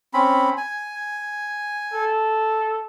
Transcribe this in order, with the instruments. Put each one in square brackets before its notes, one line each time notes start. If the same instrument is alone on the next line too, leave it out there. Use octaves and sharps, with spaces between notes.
[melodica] C4 C#4 B5
G#5
[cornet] A4